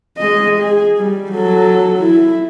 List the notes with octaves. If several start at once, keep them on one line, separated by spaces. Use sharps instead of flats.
G#3 D#5
G#4
G3
F#3 A4
E4